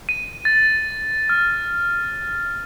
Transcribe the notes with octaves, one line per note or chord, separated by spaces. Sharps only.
D#7
A6
F6